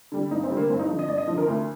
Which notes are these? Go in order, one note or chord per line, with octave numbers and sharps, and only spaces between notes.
D3 G3
G2 D#4
C4
D3 G3
A#3
G2 C4
D#4
D3 F3
D#5
G2 D5
D#5
D3 F3
A#4
D2